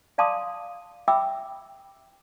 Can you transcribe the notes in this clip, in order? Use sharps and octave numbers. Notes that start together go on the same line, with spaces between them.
D5 F5 A5 C6 D6 D#6
E5 G5 B5 D6 E6